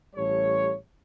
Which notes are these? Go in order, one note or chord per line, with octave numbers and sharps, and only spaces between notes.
A1 G3 A4 C#5